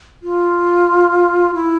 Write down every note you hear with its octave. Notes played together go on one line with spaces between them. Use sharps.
F4
E4